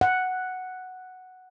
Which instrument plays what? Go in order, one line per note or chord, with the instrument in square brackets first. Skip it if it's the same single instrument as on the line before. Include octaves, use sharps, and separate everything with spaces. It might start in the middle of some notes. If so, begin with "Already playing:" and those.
[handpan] F#5